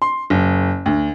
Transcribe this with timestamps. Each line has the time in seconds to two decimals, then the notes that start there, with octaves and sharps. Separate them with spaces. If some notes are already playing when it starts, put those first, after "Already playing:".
0.02 C6
0.30 F#1
0.86 D2